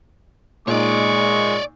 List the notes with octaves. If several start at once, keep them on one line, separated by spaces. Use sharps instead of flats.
A#2 G#3 D#4 C#5 D5 C#6